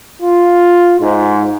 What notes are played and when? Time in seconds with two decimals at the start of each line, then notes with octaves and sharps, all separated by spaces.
0.21 F4
1.00 G#2